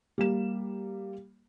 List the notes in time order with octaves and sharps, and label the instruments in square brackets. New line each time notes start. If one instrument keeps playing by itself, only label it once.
[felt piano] G3 A#3 E7